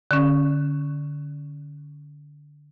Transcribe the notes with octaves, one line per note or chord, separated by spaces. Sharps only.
D3 C#4